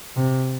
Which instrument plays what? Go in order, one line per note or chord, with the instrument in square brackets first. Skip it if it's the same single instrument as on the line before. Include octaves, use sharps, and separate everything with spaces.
[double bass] C3